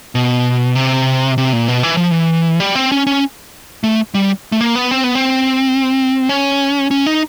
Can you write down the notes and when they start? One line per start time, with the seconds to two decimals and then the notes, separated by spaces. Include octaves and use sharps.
0.15 B2
0.75 C3
1.38 C3
1.53 A#2
1.68 B2
1.83 E3
1.97 F3
2.11 E3
2.60 G3
2.75 C4
2.92 C#4
3.07 C#4
3.84 A3
4.14 G3
4.52 A3
4.61 A#3
4.75 B3
4.91 C4
5.04 B3
5.15 C4
6.29 C#4
6.91 C#4
7.07 D#4